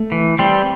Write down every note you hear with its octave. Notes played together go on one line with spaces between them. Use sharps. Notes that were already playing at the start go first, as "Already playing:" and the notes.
Already playing: A3
E3
G3 C4